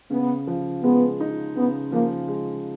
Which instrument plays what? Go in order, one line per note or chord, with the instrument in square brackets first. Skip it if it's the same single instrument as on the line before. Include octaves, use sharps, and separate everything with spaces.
[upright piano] C#3 [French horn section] B3
[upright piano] F3
[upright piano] G#3 [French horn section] B3
[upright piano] D#4
[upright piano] C#3 [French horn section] B3
[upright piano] F3 [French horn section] A#3
[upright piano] G#3